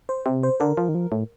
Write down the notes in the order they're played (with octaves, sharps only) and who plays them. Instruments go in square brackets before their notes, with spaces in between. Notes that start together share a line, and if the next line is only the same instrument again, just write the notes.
[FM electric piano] C5
[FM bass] C3
[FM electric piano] C5
[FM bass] D3 [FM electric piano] A#4
[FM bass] F3
D#3
F3
A2